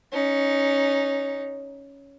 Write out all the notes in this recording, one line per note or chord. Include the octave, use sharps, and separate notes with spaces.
C#4 D#4